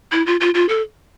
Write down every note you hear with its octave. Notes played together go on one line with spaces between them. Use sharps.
E4
F4
F4
F4
A4